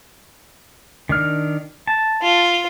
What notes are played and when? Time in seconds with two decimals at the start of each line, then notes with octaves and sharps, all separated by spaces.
1.09 D#3 D4 F6
1.87 A5
2.22 F4